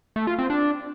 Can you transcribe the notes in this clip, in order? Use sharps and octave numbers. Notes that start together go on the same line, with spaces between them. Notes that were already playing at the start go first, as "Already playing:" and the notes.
A3
F4
C4
D4